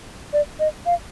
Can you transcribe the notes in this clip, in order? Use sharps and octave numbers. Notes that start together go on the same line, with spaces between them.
D5
D#5
F5